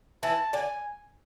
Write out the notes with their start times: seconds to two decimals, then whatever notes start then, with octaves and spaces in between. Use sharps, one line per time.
0.23 E3 E4 A5
0.53 D3 D4 G#5